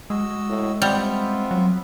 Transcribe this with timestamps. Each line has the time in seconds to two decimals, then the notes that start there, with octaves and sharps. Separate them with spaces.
0.10 G#3 F#4 D#5 E6
0.49 A2
0.82 G3 B3 C4 F4 E5
1.51 F#3